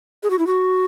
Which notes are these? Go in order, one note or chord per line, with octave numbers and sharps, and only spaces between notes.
G#4
F#4
E4
F#4